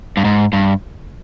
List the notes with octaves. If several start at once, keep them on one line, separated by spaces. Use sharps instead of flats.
G2
G#2
G2